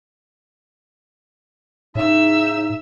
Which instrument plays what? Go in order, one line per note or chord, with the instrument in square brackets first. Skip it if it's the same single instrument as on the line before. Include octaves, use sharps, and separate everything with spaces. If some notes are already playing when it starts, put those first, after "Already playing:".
[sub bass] A2 [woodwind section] C#3 D#4 [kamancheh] E5 E6